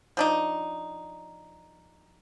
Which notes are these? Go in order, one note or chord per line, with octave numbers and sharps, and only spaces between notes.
F3 D4 D#4